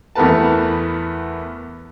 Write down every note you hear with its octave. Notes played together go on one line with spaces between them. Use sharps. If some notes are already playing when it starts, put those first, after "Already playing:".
E2 A3 B3 A#4 B4 A5